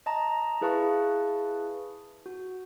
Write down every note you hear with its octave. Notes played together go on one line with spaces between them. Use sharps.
D#5 A5 A#5
E4 G#4 B4 F5 A5 C#6
F#4